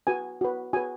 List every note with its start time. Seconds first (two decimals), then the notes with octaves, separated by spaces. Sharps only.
0.07 F#4 B4 G#5
0.41 F#4 B4
0.73 F#4 B4 G#5